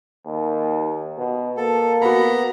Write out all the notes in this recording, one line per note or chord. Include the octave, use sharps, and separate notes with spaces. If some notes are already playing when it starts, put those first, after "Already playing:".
D#2
B2
A#3 A4
B3 F#4 A#5 B5